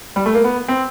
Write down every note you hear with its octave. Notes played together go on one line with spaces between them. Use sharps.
G3
A3
A#3
B3
C4